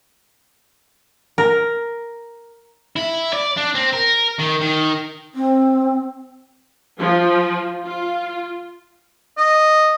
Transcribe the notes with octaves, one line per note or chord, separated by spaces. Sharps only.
A#4
E4
D5
D4
C4
A#4
D#3
D#3
C4
F3
F4
D#5